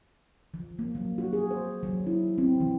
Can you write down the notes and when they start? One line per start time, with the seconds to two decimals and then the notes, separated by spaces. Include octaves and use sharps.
0.54 F3
0.79 A#3
0.95 F#3
1.18 F#4
1.33 G#4
1.51 C5
1.83 F#3
2.07 E4
2.38 C4
2.60 E3